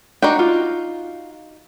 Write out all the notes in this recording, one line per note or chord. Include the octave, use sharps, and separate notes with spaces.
D4 D#4 F#4 G5
F4